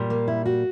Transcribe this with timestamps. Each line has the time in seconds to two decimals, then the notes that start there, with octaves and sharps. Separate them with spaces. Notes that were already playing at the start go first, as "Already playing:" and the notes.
Already playing: A#2 G3
0.10 A#3
0.28 E4
0.46 F#4